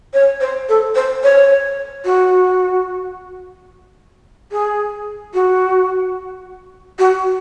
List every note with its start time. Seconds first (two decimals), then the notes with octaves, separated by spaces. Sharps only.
0.14 C#5
0.41 C5
0.69 A4
0.95 C5
1.24 C#5
2.05 F#4
4.52 G#4
5.34 F#4
6.99 F#4